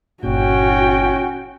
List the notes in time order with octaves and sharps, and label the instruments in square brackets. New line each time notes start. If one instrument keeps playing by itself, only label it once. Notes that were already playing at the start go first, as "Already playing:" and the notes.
[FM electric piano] G1 A#2 [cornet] C#4 [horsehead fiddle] F#4 G5